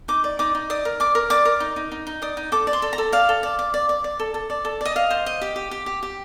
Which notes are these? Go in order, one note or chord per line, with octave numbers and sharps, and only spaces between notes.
D#4 D6
D5
D#4 D6
D#4
D5 D#6
A#4
D5 D6
A#4
D5 D6
A#4
D#4
D#4
D#4
D#4
D5 D#6
D#4
A4 D6
D5
C6
A4
A#5
A4
D5 F5
A4
D5
D5
D5
D5
D5
A4
A4
D5
A4
D5 D#5
D#5 F5
C5
D#5
G4
G4
G4
G4
G4